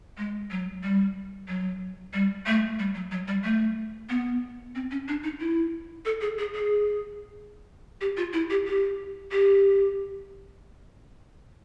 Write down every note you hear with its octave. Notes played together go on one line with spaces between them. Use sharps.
G#3
F#3
G3
F#3
G3
A3
G3
F#3
F#3
G3
A3
B3
C4
C#4
D4
D#4
E4
A4
G#4
G#4
G#4
G4
F4
E4
G4
G4
G4